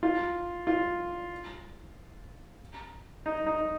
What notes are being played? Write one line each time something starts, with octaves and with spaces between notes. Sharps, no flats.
F4
F4
D#4
D#4